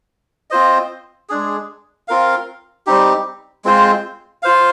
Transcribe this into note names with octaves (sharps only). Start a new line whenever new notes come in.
C4 F4 C5 D#5
G#3 D4 G#4
C4 F4 A#4 F5
G3 C4 D#4 G4
G#3 C4 F4 C5
F4 C5 F5